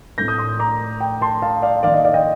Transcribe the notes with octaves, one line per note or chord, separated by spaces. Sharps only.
A2 A3 C4 G6 A#6
D#6 G6
C6 D#6
A#5 D6
G5 A#5
A5 C6
F5 A5
D5 F5
D#3 A#3 D5 F5
D#5
D5 F5
D#5 G5